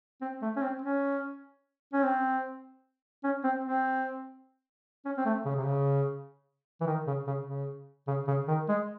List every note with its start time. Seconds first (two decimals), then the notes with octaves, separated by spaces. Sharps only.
0.22 C4
0.42 A3
0.56 C#4
0.62 C4
0.82 C#4
1.94 C#4
2.03 C4
3.24 C#4
3.44 C4
3.64 C4
5.05 C#4
5.18 C4
5.26 A3
5.46 C#3
5.56 C3
5.66 C#3
6.81 E3
6.87 D#3
7.07 C#3
7.27 C#3
7.47 C#3
8.08 C#3
8.28 C#3
8.48 D#3
8.69 G#3